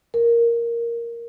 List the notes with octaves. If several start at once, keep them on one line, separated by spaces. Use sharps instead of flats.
A#4